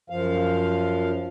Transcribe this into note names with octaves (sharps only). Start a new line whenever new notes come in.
F#2 F3 F5